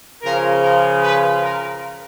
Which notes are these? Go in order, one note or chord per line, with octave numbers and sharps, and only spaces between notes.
C#3 F3 A#4
A#4
B4
A#4